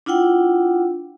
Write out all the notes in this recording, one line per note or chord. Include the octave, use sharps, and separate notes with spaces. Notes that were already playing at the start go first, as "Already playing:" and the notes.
D4 E4 F4 F#5 G5